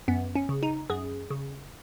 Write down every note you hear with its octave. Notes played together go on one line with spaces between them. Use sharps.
F#2 B3
C#4
C#3
D#4
F#2 G#4
C#3